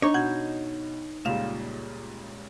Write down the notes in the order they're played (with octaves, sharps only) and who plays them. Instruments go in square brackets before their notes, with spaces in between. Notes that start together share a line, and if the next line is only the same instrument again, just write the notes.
[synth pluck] D4 [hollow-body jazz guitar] D#4 C#5
[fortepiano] B2 [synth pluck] F#5 G6 G#6
[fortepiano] C#2 A#2 G3 [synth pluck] F5 E7